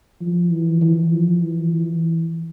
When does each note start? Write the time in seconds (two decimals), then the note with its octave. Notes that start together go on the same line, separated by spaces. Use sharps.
0.21 F3
0.50 E3
0.81 E3
1.11 F3
1.41 E3
1.72 E3